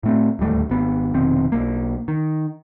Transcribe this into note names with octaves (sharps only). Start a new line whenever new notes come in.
A2 A3 C4
D1 D#2 G3 A3
G#1 B3
F1 B2 D#3 C4
B1 A#3
D#3